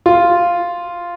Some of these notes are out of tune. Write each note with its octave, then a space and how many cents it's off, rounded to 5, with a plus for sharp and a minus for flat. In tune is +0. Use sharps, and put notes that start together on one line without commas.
F4 -5